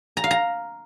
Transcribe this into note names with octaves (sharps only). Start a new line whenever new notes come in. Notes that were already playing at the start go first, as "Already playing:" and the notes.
A#5
F5
A#5